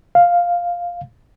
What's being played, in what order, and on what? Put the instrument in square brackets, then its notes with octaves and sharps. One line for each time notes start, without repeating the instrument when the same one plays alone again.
[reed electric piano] F5